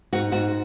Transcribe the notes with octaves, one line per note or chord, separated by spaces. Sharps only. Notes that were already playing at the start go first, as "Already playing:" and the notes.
G#2 F#4
G#2 F#4